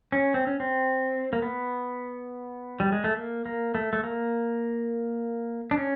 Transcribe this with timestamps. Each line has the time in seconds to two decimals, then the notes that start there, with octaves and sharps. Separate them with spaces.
0.12 C#4
0.34 C4
0.47 C#4
0.60 C4
1.33 A#3
1.42 B3
2.80 G3
2.92 G#3
3.04 A3
3.17 A#3
3.46 A#3
3.75 A3
3.93 A3
4.03 A#3
5.71 D4
5.77 C#4